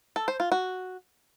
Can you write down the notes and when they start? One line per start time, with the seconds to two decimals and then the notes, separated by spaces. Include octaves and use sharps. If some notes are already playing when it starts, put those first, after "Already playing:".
0.16 A4
0.28 C5
0.40 F4
0.52 F#4